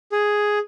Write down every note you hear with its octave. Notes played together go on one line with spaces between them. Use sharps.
G#4